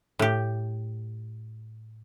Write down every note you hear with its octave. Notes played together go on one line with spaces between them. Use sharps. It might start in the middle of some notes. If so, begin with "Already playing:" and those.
A2 G4